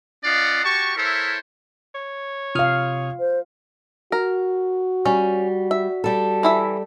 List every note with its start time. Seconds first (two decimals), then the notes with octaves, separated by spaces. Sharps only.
0.24 C#4 F4 D5 D#5 F5 F#5
0.64 F#4 G4 A5 C#6
0.97 E4 A4 A#4 C5 C#5 E5
1.94 C#5
2.55 C3 F4 F5 D#6 F6
3.20 C5
4.12 F#4 A#4
5.05 G3 C#4
5.71 E5
6.04 G3 A4
6.43 E3 E4 E5